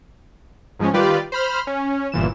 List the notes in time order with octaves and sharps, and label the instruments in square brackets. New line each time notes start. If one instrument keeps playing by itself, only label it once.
[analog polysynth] G#2 F3 G#3 C#4
D#3 G3 F4 G4 B4 D5
C5 B5 F6
C#4
G1 A#2 E3 E7